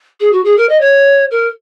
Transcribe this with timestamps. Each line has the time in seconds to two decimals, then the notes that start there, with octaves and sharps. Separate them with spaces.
0.20 G#4
0.32 F#4
0.44 G#4
0.57 A#4
0.69 D#5
0.80 C#5
1.30 A#4